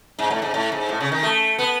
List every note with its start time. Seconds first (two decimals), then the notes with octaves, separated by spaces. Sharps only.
0.19 G#2
0.30 A2
0.42 G#2
0.54 A2
0.72 G#2
0.89 A2
1.00 C#3
1.12 D#3
1.23 A3
1.58 B3